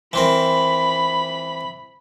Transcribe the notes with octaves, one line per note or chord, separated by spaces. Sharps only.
E3 C4 A#4 B5